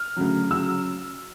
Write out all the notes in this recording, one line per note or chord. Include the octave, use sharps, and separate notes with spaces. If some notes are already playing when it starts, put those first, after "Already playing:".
Already playing: F6
D2 C#3 F#3
C#3 F#3 E6